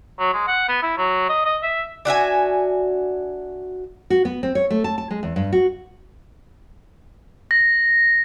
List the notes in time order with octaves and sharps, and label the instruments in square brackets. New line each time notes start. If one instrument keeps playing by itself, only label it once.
[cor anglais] F#3
G#3
F#5
B3
E4
F#3
D#5
D#5
E5
[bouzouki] D4 F#4 E5 G#5
[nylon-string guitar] F#4
B3
C4
C#5
A3
A5
A5
G#3
E2
G2
F#4
[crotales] A#6